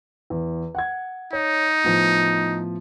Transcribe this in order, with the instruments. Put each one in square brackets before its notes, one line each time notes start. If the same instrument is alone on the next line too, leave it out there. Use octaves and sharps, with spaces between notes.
[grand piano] E2
F#5 G#6
[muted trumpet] D#4 [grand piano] C#5
[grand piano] A2 F3 B3